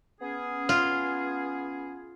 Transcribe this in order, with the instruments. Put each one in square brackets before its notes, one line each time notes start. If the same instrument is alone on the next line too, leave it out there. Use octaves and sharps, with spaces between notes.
[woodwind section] B3 C#4 G#4
[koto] F4